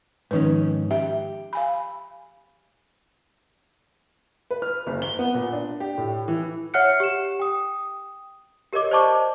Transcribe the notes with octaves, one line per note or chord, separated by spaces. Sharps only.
G#2 D#3 F3 C#4 B4
G4 E5
F5 G#5 B5
B4
F6
F#1
G7
B3
A#2
D4
G4
A2
E3
C#5 E5 F#5 F6 F#6 C#7
G4 E7
G5 D#6
G4 A#4 C#5 D#5 D6
C5 D5 D#5 A5 C#6 D6